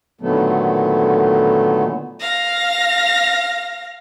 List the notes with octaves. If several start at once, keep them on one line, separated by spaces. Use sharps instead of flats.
A#2 D3 D#3 F#3 A3 B3
F5 A#6